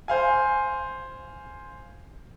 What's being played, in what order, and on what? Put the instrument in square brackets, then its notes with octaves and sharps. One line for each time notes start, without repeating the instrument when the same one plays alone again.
[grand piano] C5 F5 G#5